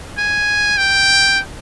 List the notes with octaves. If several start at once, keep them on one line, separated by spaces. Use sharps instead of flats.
G#5
G5